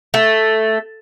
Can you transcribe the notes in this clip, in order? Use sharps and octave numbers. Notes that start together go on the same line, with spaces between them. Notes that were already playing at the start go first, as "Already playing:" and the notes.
A3